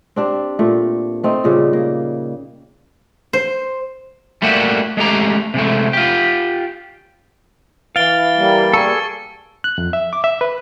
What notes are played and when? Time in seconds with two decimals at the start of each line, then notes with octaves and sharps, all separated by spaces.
0.16 C4 D4 G4
0.59 A#2 A3
1.23 A3 C4 D#4
1.44 A#2 C#3 G3
1.73 A#3
3.33 C5
4.42 G3 A3 A#3 F#4 G4 E5
4.97 G#3 A3 G4 A#5
5.54 C3 G#3 A3
5.93 F4 G4
7.96 E3 F5 A6 D7 G7
8.37 G3 A#3
8.73 G#4 A4 C#6
9.64 F#6
9.78 F2
9.93 E5
10.13 D6
10.24 E5
10.41 B4